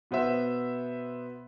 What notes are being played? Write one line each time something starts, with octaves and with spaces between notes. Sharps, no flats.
B2 B3 C5 E5